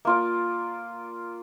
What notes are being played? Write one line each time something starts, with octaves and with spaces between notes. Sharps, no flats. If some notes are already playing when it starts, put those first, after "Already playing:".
A#3 F4 D5